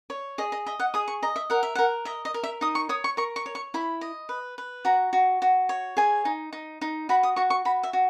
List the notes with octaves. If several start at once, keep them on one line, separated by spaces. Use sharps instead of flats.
C#5
G#4 D#5
D#5
D#5 E5
F#5
G#4 D#6
C#6
D#5 A#5
E5
A#4 F#5
E5
A#4 F#5
D#5 E5
D#5
A#4
E5
D#4 D#6
C#6
C#5 D#6
C#6
A#4 C#6
C#6
C#5
C#6
E4 B5
D#5
B4
B4
F#4 A#5
F#4
F#4
C#5
G#4 G#5
D#4
D#4
D#4
F#4 B5
D#6
F#4 C#6
C#6
F#4 B5
E5
F#4